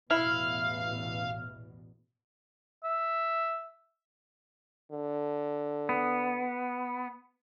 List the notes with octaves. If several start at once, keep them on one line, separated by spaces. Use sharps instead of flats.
A1 E2 B2 E4 F5 F6
E5
D3
B3